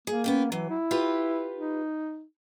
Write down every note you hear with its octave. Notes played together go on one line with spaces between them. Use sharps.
A#3 G#4
B3 C#4 G5
E3 F#3
E4
F4 G4 B4
D#4